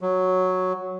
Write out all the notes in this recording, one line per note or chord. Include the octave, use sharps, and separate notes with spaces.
F#3